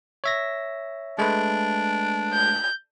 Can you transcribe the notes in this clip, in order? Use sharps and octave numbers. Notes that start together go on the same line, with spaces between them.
C#5 E5 A#6
G#3 A3 D4 B4
G6